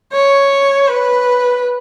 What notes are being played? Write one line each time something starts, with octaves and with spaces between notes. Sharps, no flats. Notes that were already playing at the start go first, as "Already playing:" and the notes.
C#5
B4